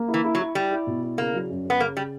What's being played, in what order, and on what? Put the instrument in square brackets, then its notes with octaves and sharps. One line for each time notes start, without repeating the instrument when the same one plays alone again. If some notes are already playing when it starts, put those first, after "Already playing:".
Already playing: [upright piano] A#3
E4
[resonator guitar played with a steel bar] E3
[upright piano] E4
[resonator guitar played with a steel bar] F#3
[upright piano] E4
[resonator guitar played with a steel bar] G3 [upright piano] E4
[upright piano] E4
B2
E4
[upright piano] C#3 [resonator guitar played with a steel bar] A#3
[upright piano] F#3
F#2
[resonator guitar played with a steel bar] B3 [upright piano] C#4
[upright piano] C#3 [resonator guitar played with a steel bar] A#3
[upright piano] C#3 [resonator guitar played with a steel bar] G3